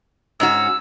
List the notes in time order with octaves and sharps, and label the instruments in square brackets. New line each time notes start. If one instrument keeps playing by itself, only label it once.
[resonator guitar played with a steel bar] G#2 C#4 F#4 [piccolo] E6